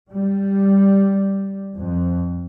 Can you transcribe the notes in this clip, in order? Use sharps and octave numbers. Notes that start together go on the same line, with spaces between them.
G3
F2